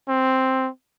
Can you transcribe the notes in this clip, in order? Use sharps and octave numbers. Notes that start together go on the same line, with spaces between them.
C4